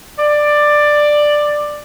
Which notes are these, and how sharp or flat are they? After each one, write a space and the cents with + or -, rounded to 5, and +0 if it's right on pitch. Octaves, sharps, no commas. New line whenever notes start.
D5 +10